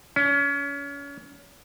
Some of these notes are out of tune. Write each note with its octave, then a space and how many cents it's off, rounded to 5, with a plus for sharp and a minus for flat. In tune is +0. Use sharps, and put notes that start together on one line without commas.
C#4 +30